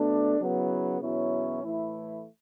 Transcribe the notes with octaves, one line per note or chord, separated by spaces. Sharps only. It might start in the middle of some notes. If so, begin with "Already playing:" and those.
Already playing: B2 A3 D4
C#3 F#3 B3 E4
E2 B2 F#3 C#4 E4
A2 E3 A3 E4